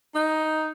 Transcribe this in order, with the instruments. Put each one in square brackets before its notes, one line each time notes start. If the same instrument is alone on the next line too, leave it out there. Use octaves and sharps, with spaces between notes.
[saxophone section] D#4